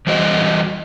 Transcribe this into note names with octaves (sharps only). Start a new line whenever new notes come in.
E3 G3 F#4 C5 D#5